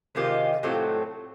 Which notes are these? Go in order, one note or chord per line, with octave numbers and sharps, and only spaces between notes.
C3 D#3 G#3 F4 G4
A2 F#3 A3 C4 F4 G4